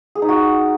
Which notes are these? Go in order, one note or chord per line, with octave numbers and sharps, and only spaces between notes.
G#4
D#4
F#4